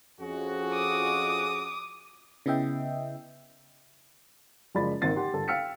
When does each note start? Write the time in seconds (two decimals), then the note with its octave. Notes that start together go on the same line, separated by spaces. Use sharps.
0.20 F2 F3 C#4 F#4 G#4
0.73 D6 D#6
2.46 C#3 B3 E4 D#5 E5 G5
4.75 F#1 F3 G#3 D5 B5 A6
5.02 G#1 A#3 C4 A6 C7
5.16 G4 F#5 C6
5.33 G1 A4 A5
5.48 F5 G5 E6 F6 B6 C#7